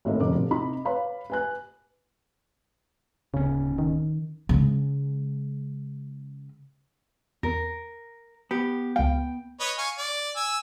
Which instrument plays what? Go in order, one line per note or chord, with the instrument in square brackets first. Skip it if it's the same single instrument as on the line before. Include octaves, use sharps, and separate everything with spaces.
[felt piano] G#1 A2 A#3 D#5
F1 F#2 D3 D6
D#1
C3 D#4 B5
B4 C#5 F5 B5
B4 G#5 F#6
[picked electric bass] D1 C#4 [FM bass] C#3
[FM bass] D#3
[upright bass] C#3 G#3
[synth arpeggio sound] E2 [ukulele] A#4
[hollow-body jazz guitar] B3 [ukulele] G4
[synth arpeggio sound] C#2 F5 [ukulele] G5
[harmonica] B4 C#5 D#5
F5 G#5 C#6
D5
G#5 E6